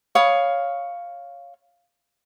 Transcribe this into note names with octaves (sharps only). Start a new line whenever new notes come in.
C#5 F5 B5 D#6